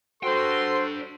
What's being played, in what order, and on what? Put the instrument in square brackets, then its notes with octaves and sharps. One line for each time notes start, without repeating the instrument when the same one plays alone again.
[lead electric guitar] D4 G5 [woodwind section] F#4 A4 [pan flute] C5 [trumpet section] C6